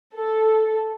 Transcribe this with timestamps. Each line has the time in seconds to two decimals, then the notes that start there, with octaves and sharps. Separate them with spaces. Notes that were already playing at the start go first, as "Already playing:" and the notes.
0.15 A4